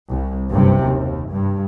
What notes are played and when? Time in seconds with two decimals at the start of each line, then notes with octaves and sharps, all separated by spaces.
0.11 C2
0.51 F#1 G2 C3
0.84 D#2
1.32 G2